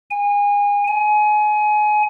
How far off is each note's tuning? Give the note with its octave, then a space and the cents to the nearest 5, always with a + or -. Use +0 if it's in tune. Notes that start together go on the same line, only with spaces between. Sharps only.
G#5 -30
G#5 +25